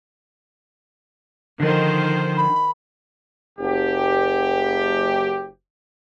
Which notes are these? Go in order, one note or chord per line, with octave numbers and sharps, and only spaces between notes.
D3 D#3 F3 C5
B5
F#1 G4